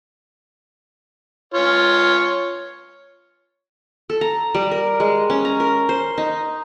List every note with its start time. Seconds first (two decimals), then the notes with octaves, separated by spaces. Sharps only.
1.54 F4 C#5
4.10 A4
4.21 A#5
4.54 G3
4.71 A#4
5.00 G#3
5.30 C#4
5.45 A#5
5.60 A#4
5.89 C5
6.18 D#4